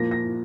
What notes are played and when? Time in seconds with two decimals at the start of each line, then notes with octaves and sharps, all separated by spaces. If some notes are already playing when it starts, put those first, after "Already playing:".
Already playing: A#2 F3 A#3 A#6
0.11 A#6